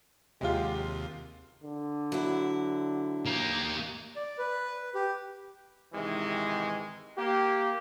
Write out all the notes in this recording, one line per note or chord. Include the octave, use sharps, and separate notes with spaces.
D#2 C3 F#3 G#3 F4 G4
D3
F#3 E4
A#3 G4
D5
B4
G4
G#2 C3 D#3 E3 G#3
A#3 G4